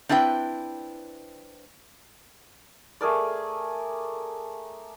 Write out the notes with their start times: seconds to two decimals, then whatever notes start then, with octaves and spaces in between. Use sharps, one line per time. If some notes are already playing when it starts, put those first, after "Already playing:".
0.09 C4 D4 E4 B4 G5
3.01 A3 G#4 A#4 D5